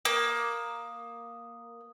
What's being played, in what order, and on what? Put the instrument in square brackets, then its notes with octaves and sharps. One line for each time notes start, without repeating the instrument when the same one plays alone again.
[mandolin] A#3 [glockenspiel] D#6